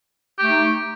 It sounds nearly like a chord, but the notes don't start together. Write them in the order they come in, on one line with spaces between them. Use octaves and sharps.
G4 A3 D#4